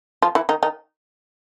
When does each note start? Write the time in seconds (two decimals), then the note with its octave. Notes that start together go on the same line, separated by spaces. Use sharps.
0.22 F3 F4
0.35 E3 E4
0.49 D#3 D#4
0.63 D#3 D#4